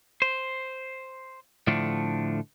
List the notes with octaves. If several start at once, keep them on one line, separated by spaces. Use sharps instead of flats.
C5
A2 D3 F3 A3 D4